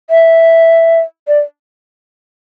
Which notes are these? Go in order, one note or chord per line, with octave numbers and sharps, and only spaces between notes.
E5
D5